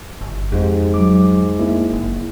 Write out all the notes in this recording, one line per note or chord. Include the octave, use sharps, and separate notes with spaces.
G1
F2 G#2 G4
F#3 D6
A#3 E4
F#1